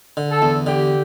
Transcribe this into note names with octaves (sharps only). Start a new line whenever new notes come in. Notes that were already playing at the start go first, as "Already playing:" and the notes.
D3
A4
E2
D3 G4